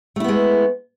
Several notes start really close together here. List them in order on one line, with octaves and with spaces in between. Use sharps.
A3 E4 B3 G#3